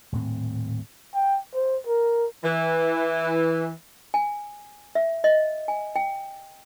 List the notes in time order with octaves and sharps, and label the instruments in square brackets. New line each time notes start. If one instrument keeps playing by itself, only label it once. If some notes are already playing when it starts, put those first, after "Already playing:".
[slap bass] D#1 A2 C4
[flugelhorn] G5
C5
A#4
[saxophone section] E3
[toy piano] G#5
E5
D#5
G#5
G5